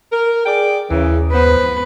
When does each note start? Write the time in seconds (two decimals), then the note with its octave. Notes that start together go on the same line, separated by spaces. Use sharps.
0.12 A#4
0.46 G#4 D5 G5
0.91 D#2 C#3 E3
1.34 B3 B4 C5